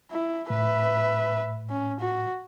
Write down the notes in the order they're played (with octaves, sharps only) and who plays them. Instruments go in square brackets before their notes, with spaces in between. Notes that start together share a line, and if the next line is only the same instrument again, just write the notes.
[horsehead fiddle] E4
[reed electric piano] A2 [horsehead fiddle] B4 E5
[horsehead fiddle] C#4
F#4